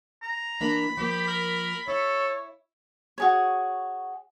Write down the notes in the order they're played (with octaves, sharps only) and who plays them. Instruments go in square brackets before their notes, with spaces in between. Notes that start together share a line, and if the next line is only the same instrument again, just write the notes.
[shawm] A#5
[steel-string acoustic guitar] E3 A#3 D4 [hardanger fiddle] B5
[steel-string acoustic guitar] F3 A#3 [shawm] G4
[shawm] A#4
[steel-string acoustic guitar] E4 [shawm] A4 [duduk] C#5
[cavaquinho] F#4 G#4 C#5